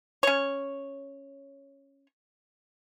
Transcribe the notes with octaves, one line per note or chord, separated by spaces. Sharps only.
C#4 C#5